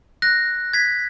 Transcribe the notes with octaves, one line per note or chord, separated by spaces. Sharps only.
F#6 A#6
G#6 B6